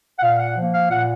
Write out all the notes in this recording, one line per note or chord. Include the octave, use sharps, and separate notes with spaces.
F#5
A#2 F5
F#5
F3 A#3
F5
A#2 F#5